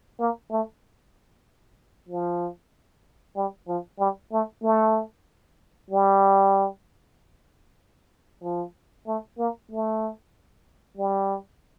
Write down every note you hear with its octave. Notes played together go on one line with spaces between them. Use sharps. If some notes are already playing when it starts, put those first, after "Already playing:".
A#3
A3
F3
G3
F3
G3
A3
A3
G3
F3
A3
A#3
A3
G3